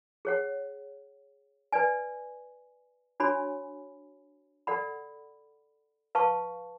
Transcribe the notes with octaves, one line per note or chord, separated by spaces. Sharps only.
G#4 C#5 F#5
B4 D5 G#5
D4 F#4 C#5 G#5 B5
A4 D5 F#5 B5
B4 F5 A5 C#6